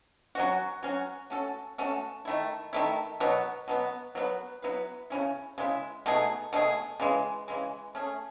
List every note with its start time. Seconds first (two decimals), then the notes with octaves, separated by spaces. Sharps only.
0.35 F#3 C#4 F#4
0.83 F#3 C#4 F#4
1.30 A3 C#4 F#4 A4
1.78 A3 C#4 F#4 A4
2.25 D#3 A3 E4
2.73 D#3 A3 E4
3.20 B2 F#3 B3
3.68 B2 F#3 B3
4.15 F#3 B3 E4 B4
4.62 F#3 B3 E4 B4
5.10 C#3 G#3 C#4 E4
5.58 C#3 G#3 C#4 E4
6.06 B2 A3 D#4 G#4
6.53 B2 A3 D#4 G#4
7.00 C#3 E3 G#3
7.48 C#3 E3 G#3
7.95 A3 C#4 G#4